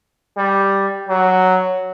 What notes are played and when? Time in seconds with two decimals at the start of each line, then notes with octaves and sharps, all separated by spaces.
0.37 G3
1.08 F#3